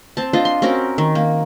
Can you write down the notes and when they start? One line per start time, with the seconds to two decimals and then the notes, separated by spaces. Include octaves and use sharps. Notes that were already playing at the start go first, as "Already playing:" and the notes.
0.17 C4 A5
0.33 D4 F4 D#5
0.45 C6
0.62 C4 C#4 F#4 A#4
0.98 D#3
1.15 A#3